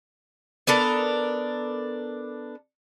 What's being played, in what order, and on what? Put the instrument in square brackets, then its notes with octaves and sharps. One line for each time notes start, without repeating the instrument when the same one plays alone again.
[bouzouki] B3 D4 A4 A#4